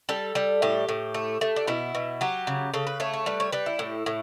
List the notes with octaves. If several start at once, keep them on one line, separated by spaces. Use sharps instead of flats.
G3 A4
G3
A2 G4
A2
A3
A3
D4
B2 E4
B2
F#3 G4
C#3
C#3 A4
B4
A3 C#5
C#5
G3 B4
C#5
G3 B4
E4
A2
A2